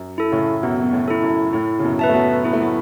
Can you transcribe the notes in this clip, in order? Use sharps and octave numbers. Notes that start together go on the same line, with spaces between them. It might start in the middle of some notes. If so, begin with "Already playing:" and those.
Already playing: F#2
E4 A4
A2 C#3
F#2 B2 B3
B2
A2
E4 A4
F#2
A2 E4
C#3
F#2 B2
B4 E5 A5
A3
F#3 B3
B3 E4
A3
F#3 B3